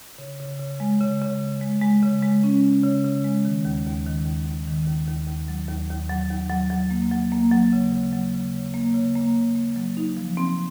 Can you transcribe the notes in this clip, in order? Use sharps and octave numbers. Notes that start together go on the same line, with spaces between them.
C#3
C#3
C#3
G#3
C#3
C#3
C#3
G#3
G#3
C#3
G#3
C#4
C#3
C#3
C#3
G#3
D#3
D#2
D#2
D#3
D#2
D#2
D#3
D#2
D#2
D#2
F#3
D#2
D#2
F#3
D#2
F#3
F#3
A#3
F#3
A#3
F#3
C#3
C#3
F#3
C#3
C#3
A#3
C#3
A#3
C#3
A#3
F#3
D#4
F3
C4